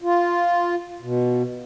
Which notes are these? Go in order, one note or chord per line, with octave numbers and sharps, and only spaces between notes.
F4
B2